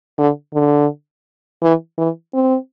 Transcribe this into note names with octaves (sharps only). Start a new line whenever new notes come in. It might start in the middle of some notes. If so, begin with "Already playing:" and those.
D3
D3
E3
E3
C4